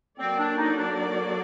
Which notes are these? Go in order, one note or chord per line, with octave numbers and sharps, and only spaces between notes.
F#3 A#3 C4 F#4 A4 D5
D4
D#4
D4